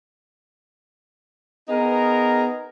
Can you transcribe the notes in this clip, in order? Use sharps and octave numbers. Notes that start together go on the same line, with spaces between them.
B3 D#4 G#4 A#4